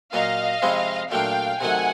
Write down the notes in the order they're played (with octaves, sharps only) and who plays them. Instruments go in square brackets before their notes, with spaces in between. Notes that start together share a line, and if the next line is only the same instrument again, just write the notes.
[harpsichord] A#2 F#3 A#3 [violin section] D#5 F5
[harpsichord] C3 F3 G#3 C4 E4
[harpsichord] A#2 F#3 A3 D4 [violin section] F5 G5
[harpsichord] C3 D#3 F#3 A3 [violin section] F#5 G#5